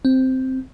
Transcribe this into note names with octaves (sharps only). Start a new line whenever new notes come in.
C4